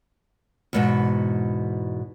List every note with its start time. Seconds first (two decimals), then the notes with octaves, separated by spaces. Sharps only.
0.73 E2 G#2 B2